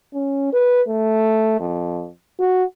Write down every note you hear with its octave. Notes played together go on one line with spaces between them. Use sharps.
C#4
B4
A3
F2
F#4